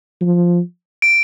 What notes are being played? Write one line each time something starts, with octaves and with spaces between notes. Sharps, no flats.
F3
D7